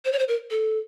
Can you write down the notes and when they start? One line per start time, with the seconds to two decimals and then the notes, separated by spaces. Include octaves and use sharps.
0.05 C5
0.12 C#5
0.19 C5
0.28 A#4
0.50 A4